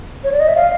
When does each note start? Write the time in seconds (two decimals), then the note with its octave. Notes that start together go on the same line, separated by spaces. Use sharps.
0.24 C#5
0.32 D5
0.40 D#5
0.48 E5
0.56 F5